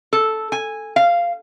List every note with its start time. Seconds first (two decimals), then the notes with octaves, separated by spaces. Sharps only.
0.13 A4
0.52 G#5
0.96 F5